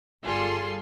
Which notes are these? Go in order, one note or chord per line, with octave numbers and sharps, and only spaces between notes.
G1 G3 F4 G#4 A4 C6